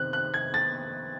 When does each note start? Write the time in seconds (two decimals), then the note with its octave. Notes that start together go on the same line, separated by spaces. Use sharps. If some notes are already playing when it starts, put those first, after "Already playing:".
Already playing: C3 D#3 C4 F#6
0.13 F#6
0.34 G#6
0.54 A6